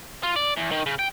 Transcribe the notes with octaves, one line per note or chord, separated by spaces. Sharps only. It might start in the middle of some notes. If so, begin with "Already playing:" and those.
F4
D5
E2
D#3
C#3
G5